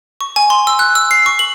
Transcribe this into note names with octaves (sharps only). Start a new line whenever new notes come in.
C#6
G#5
C6
E6
F#6
E6
C7
C#6
F#7